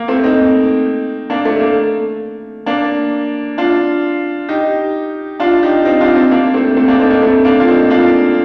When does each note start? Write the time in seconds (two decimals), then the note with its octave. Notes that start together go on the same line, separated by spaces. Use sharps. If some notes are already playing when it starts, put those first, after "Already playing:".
Already playing: A#3
0.08 A3 C4
0.23 C4 D#4
1.30 A#3 D4
1.45 A3
1.60 A#3
2.66 A#3 D4
3.58 D4 F4
4.49 D#4 G4
5.40 D4 F4
5.63 D#4 G4
5.85 C4 D#4
6.01 D4 F4
6.15 C4 D#4
6.31 A#3 D4
6.54 A3 C4
6.76 A3 C4
6.88 A#3 D4
6.99 C4 D#4
7.10 A#3 D4
7.22 A3 C4
7.45 A#3 D4
7.60 F4
7.68 C4 D#4
7.90 D4 F4